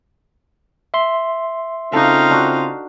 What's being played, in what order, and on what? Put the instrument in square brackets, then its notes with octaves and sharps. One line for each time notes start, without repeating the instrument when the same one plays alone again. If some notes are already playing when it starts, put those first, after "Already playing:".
[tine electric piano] E5 C6
[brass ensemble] C#3 C4 F4 [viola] D#4 F5 [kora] F#4 A4
[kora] D4 F#4